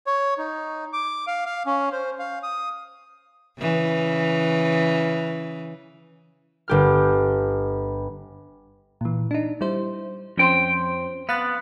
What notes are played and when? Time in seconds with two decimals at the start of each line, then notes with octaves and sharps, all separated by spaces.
0.06 C#5
0.38 D#4
0.93 D6
1.27 F5
1.46 F5
1.66 C#4
1.92 C5
2.19 F5
2.43 D#6
3.58 C#3 E3
6.68 G1 G4 F6
9.01 A#2 E3
9.31 D4 D#4
9.61 G3 E4 C5
10.37 F2 F3 C#4 C5 G5 C6
11.29 B3 F5 F#6 A6